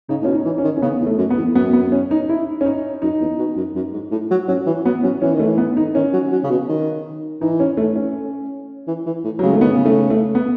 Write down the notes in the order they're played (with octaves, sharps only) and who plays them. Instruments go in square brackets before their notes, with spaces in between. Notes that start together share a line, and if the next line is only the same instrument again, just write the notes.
[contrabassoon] C#3 [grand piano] D#4
[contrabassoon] A2
[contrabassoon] B2 [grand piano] C#4
[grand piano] D#4
[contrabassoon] E3
[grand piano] C#4
[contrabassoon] D#3
[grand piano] C#4
[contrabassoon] C#3 [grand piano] B3
[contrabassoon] E2
[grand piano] A3
[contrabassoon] F#2
[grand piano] B3
[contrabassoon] E2
[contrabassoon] F#2 [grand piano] B3
[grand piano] B3
C#4
D#4
E4
C#4
D#4
[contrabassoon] F#2 [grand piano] D#4
[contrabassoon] E2
B2
F#2
F#2
G#2
A2
F#3
[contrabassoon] F#3 [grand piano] C#4
[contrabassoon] E3
[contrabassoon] F#3 [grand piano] B3
[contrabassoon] F#3 [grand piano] C#4
[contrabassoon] E3 [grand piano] C#4
[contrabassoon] D#3
[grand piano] A3
[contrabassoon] E3
[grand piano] B3
D#4
[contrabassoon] D#3 [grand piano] C#4
[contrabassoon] F#3
F#3
C#3
B2
D#3
[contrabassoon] E3 [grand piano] D#4
[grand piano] C#4
A3
C#4
[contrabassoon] E3
E3
A2
[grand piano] F#3
[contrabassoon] C#3 [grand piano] G#3
[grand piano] A3
[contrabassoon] D#3 [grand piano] B3
[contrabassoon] C#3
[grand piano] A3
A3
B3